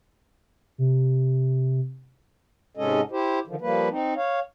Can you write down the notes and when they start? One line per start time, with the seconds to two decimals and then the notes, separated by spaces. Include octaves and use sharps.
0.78 C3
2.77 G#2 C3 G#3 C#4 A4 D#5
3.12 E4 G4 C5
3.47 D3 D#3 F3
3.61 F3 G3 A#3 B4
3.90 C4 D#4
4.16 C#5 F5